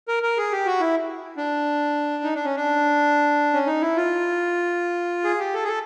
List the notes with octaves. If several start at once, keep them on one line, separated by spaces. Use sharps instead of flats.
A#4
A#4
G#4
G4
F#4
E4
D4
D#4
D4
C#4
D4
C#4
D#4
E4
F4
G#4
G4
A4
G#4
A4